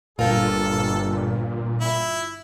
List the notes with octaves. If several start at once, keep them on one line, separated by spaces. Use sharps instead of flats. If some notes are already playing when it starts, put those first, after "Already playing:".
G1 A#2 F4 A4 A#4 G5
E4